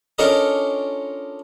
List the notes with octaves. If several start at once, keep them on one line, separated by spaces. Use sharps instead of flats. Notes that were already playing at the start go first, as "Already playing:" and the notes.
C#4 D4 F4 A4 A#4 D#5